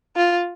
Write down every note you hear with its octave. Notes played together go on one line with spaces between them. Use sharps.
F4